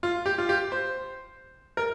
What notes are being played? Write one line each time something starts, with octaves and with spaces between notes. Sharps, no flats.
F4
G4
F4
G4
C5
A#4